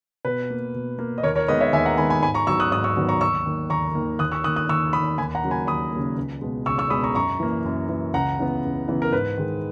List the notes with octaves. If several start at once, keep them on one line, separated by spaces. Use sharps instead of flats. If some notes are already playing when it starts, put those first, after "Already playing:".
B2 B4
A#3
B2
A#3
D#5
D#2 A#4 C#5
A#4 C#5
D#3 G#3 B3 B4 D#5
C#5 E5
D#2 E5 G#5
F#5 A#5
D#3 G#3 B3 G#5 B5
G#5 B5
G#2 G#5 B5
A#5 C#6
D#3 F#3 B3 C#6 E6
D#6 F#6
G#2 D#6 F#6
C#6 E6
D#3 F#3 B3
A#5 C#6
D#2 C#6 E6
D#3 A#3
D#2 A#5 C#6
D#3 A#3
D#2 D#6 F#6
C#6 E6
D#3 A#3 D#6 F#6
D#6 F#6
D#2 C#6 E6
D#3 A#3 B5 D#6
D#2 G#5 B5
F#5 A#5
C#3 F#3 A#3
G#5 B5
D#2 B5 D#6
C#3 F#3 A#3
C#2
B2 G#3
C#2 C#6 E6
C#6 E6
B2 G#3 B5 D#6
A#5 C#6
F#2 A#5 C#6
E3 A#3
F#2
E3 A#3
C#2 F#5 A#5
C#3 E3 B3
C#2
C#3 E3 B3
A#4
G#2 B4
D#3 G#3